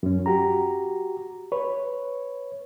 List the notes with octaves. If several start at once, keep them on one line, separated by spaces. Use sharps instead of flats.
F#2 C#4
F#4 G4 A#5
B4 C#5